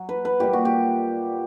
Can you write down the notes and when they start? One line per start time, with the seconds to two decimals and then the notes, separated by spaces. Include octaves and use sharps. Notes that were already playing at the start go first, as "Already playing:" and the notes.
Already playing: F#3
0.09 B4
0.25 B4
0.40 A#2 G3 G4
0.53 F#4
0.65 G4